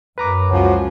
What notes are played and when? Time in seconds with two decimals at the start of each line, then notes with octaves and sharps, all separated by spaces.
0.18 F#2 B4 A#5 D6
0.50 C#2 F3 C#4 F#4